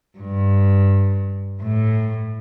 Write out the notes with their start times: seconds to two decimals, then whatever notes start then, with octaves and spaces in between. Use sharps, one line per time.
0.18 G2
1.62 A2